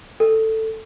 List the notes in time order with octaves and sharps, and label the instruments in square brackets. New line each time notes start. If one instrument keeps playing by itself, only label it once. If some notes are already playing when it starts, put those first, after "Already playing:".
[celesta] A4